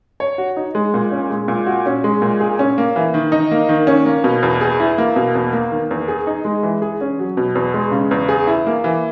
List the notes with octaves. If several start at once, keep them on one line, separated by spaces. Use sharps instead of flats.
C#5
F#4
D#4
G#3
A#2
C#4
G#3
A#2
F#4
C#4
G#3
A#2
G#4
C#4
A#3
E3
D#3
D#4
A#3
D#3
C#4
A#3
B2
E2
G#4
E4
A#3
B2
E2
A#3
D#3
E2
G#4
D#4
G#3
E3
G#4
C#4
F#3
B2
E2
G#3
C#3
E2
G#4
E4
A#3
E3